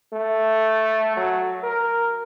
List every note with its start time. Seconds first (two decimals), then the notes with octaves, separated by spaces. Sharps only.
0.13 A3
1.17 F#3
1.63 A#4